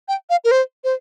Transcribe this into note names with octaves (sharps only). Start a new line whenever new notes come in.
G5
F5
A#4
C5
C5